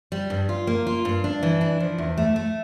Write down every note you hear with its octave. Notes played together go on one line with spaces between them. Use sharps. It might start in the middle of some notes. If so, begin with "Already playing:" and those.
G3
G2
F4
A#3
F4
G2
D4
E3
D4
F3
E2
A3
A3